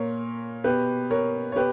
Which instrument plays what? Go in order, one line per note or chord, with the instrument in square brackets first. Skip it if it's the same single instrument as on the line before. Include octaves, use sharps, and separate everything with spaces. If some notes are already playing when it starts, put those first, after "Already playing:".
Already playing: [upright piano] A#2 A#4 C#5
B2 G4 B4
A#4 C#5
C#5
B2 G4 B4